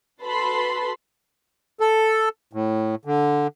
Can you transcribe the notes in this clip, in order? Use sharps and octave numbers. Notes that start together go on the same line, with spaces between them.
F#4 A4 B4 A5 B5 C6
A4
A2
D3